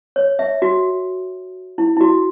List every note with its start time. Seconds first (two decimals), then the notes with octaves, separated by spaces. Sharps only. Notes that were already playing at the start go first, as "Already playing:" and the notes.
0.16 C#5
0.39 E5
0.62 F#4
1.78 E4
1.97 E4
2.01 F#4